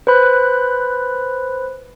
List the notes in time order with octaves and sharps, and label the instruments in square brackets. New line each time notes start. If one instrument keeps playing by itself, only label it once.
[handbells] B4 C5 B5 F#6